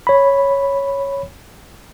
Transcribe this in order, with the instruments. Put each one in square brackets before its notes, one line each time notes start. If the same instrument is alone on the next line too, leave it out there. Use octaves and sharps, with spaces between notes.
[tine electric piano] C#5 B5